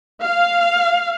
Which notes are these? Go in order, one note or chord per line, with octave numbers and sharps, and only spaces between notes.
F5